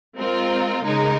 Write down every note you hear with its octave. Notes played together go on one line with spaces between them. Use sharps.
G#3 C4 F4 A#4
C#3 G#3 D#4 A#4